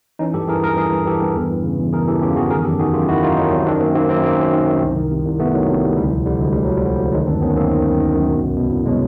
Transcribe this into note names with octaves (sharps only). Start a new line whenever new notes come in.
E3 C#4 D#4
G2 G4 A4
E3 G#4 A#4
G2 G#4 A#4
E3 G#4 A#4
G2
E3 G4 A4
G2
E2
E3
C#3
E2
E2 G#4 A#4
E3 G4 A4
C#3 F4 G4
E2 F#4 G#4
D#3 G#4 A#4
F#2 G4 A4
D#3 F#4 G#4
F#2 F4 G4
D#3 E4 F#4
F#2 D#4 F4
D#3 C#4 D#4
F#2 C4 D4
D#3 C4 D4
F#2 A#3 C4
D#3 A#3 C4
F#2 A#3 C4
D#3 A#3 C4
F#2
D#3
F#2
C2
D#3
C3
C2
C2 A3 B3
D#3 F#3
C3
C2 G3
D2 G3
F3
D3 G3
D2 G#3
D2 G3
F3 F#3
G3
D3
D2
D#3 F#3 G#3
F#2 C4 D4
D#3 B3 C#4
F#2 A#3 C4
D#3
F#2
D#3
F#2
B2
C2
B2
C2
B2 F#3 G#3